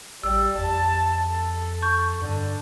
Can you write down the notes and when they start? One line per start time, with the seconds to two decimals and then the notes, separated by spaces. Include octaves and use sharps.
0.23 A1 G3 E6
0.58 F2 A5
1.29 A4
1.82 C#6 G6
2.22 G2 D3